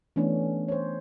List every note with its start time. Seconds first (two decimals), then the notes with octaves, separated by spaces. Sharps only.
0.16 E3 A3 B3 C#4 D4
0.68 C5 C#5